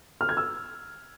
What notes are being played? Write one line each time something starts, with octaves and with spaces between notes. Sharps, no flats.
F6
G#6
E6